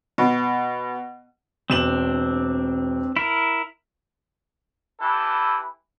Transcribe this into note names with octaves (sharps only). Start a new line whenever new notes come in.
B2
E1 C4 D4 E7 F#7
E4 A#4
E3 E4 G4 A4